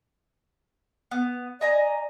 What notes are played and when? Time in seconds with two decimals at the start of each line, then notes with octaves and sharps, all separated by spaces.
1.11 B3
1.61 D5 D#5 G#5 A#5